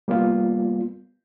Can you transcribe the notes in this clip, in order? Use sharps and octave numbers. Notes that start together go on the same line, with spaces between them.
G3 A#3 B3 F4